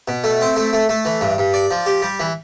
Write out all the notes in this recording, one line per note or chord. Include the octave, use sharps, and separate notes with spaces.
B2
A3
C4
A3
A3
A3
E3
G2
G2
D5
F3
G4
G3
E3